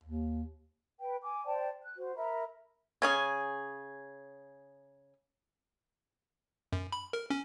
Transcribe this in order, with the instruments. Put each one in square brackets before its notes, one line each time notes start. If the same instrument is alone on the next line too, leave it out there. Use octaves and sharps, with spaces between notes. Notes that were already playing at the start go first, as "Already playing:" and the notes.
[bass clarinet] D#2
[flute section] B4 G5
G#5 D6
C5 D5 G5 A5
F#6
F#4 C5
A#4 E5 A#5 B5
[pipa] C#3 C#4 G#4
[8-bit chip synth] F#2
B5
A#4
C#4